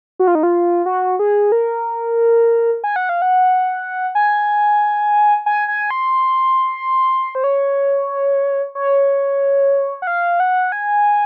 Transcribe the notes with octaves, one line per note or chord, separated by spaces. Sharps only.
F#4
F4
D#4
F4
F#4
G#4
A#4
G#5
F#5
F5
F#5
G#5
G#5
G#5
C6
C5
C#5
C#5
F#5
F5
F#5
G#5